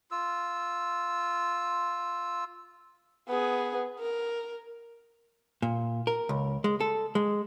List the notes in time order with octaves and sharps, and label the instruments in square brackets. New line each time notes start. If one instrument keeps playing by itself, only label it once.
[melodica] F4 E6
[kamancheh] B3 G#4
A#4
[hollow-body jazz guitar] A#2
A#4
C#2
G#3
A4
G#3